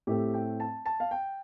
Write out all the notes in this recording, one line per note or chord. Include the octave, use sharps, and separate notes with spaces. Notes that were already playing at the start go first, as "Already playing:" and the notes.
A2 A3 C4 G4
G5
A5
A5
F5
G5